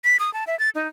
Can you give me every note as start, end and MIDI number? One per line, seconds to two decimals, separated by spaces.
0.04 0.17 95
0.20 0.33 87
0.34 0.44 81
0.47 0.58 76
0.59 0.69 93
0.75 0.88 63